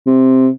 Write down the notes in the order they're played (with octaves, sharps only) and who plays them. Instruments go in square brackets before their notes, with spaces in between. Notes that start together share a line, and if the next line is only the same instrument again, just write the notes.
[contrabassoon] C3